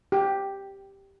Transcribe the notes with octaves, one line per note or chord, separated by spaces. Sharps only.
G4